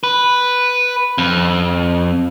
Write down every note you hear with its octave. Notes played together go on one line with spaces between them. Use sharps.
B4
F2